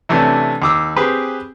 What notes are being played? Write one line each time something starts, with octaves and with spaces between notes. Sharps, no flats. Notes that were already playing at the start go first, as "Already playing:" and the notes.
C3 E3 A3 C#4 D4
D#2 D6 E6
C4 G4 G#4 B4